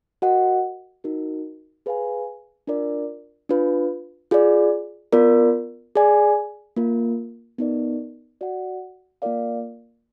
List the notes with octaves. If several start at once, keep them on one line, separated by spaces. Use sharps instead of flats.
F#4 A#4 D#5 F#5
D#4 F#4 A#4
G#4 B4 F5 G#5
D4 F4 A#4 D5
D4 F4 B4
F4 G#4 D5
B3 F4 A#4 D5
G#4 D5 G#5
A#3 F4 A#4
B3 D#4 A#4 D5
F#4 D5 F#5
A#3 F4 A#4 D5 F5